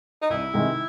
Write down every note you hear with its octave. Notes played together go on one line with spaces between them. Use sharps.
D#4
C2 E4
C3 D#3 G#3